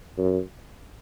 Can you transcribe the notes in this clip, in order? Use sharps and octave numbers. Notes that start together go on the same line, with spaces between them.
F#2